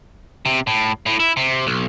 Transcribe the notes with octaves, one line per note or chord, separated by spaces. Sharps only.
C3
A2
A2
E4
C3
B1